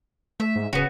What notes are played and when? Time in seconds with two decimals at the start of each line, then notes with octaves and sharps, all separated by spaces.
0.40 A3 E5
0.55 G#2
0.73 D1 C#3 B3 F#4